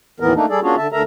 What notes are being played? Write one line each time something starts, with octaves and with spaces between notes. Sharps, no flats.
D#2 A2 E3 B3 A#4
A3 A#3 D4 D#4
G3 G#4 A4 D5
A#3 C#4 D4 F4 F#4 G#4
D3 E5 A5
D2 D3 A4 A#4 E5 A#5